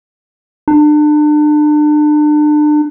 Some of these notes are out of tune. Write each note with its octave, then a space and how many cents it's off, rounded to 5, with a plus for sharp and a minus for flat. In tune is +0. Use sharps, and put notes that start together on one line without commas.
D4 +35